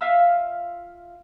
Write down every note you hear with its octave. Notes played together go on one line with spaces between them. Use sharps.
F4 E5 F5 E6